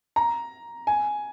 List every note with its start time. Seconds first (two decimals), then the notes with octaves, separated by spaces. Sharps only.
0.16 A#5
0.87 G#5